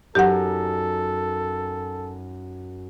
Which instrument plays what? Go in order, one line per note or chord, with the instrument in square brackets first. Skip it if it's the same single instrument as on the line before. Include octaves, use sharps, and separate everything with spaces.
[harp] F#2 D#4 A#6 [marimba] G4 F#5 [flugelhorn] A4